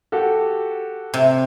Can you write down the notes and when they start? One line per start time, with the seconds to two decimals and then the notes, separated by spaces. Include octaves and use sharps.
0.12 F#4 G4 A4
1.14 C3